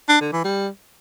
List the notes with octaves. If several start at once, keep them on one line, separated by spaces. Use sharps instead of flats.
D4
D3
E3
G3